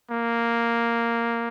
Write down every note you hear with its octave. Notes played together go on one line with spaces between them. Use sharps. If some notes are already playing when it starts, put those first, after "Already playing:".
A#3